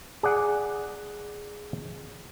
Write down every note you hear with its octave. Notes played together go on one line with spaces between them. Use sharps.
G#4 D5 F#5